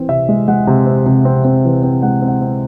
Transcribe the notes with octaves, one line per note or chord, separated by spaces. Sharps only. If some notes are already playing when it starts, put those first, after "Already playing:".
Already playing: E3 C4
C3 E5
G#3
G#3 F#5
C3
C4
C3
C4
C4
E3
C4
G#3 F#5
C4
F#5
C4